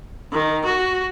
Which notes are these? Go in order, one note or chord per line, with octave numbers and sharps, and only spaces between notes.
D#3
F#4